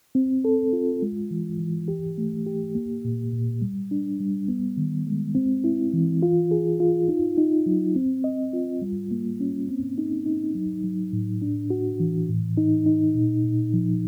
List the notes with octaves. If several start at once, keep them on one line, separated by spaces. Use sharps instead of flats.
C4
A4
F4
G#3
E3
E3
G4
A3
G4
A#3
A#2
A#2
G3
D4
G3
B3
D#3
G#3
C4
E4
E3
F4
G#4
F4
D#4
D#4
F#3
C4
D#5
F4
G3
A#3
C#4
C4
D#4
D#4
F#3
F#3
A2
D4
F#4
E3
A2
D#4
D#4
A#2
A#2
F3